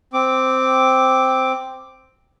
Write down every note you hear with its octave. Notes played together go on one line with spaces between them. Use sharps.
C4 D6